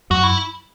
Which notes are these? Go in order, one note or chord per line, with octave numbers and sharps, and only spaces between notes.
F#2 F#4
E4